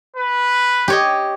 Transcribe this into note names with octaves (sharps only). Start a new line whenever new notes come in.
B4
G4 C#5 D#5